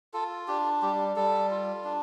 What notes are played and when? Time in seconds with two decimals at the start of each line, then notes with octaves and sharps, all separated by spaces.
0.14 F4 A4
0.48 D4 G4
0.82 G3 G4
1.16 G3 A4
1.51 F4
1.84 D4